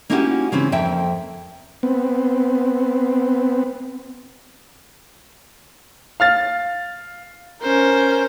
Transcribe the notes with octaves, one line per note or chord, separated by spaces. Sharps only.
A#3 C#4 D#4 E4 F#4 G4
C#3 E3 C4 C#4
F2 A#3 E5 G5
B3 C4
F5 F6 A6
C#4 A#4 C5